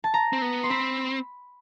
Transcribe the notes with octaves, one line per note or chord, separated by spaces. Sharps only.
A5
A#5
C4
B3
C6
C4 B5